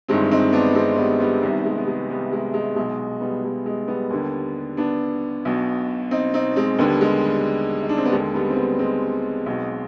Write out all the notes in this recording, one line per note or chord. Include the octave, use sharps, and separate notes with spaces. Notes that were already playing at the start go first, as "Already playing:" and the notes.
G1 G2 D#3 G#3 C4
C4 D#4
B3 D4
G#3 C4
G3 B3
G3 B3
C2 C3 D#3 G3 B3
G#3
B3
G#3
G3 B3
G#3
G#3
B1 B2 G#3
G3 B3
G#3
G#3
G3 B3
D#2 D3
B3 D4
B1 B2
C4 D#4
C4 D#4
G#3 C4
D#2 D3 G3 B3
G#3
G3
D#4
D4
C4
B3
D#2 D3 G#3
G3 B3
C4
G3 B3
G#3 C4
B1 B2